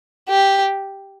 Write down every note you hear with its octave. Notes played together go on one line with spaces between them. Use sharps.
G4